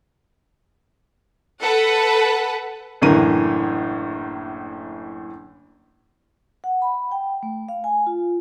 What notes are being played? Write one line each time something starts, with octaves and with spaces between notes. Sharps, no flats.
A4 B4 F#5
F#1 A2 D3 E3 A#4 D#7
F#5
B5
G5
A3
F5
G#5
F4